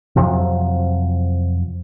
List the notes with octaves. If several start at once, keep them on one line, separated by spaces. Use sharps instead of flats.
F2 C3 F3 F#3